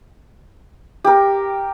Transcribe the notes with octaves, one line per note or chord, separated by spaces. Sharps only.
G4 A#4